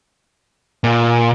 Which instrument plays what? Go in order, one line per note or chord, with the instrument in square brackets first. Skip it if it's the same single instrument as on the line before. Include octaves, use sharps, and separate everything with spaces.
[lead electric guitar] A#2